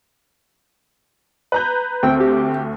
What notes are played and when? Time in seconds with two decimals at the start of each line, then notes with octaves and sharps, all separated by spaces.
1.52 B4 A#5 G6
2.03 D2 C4 G5
2.20 G4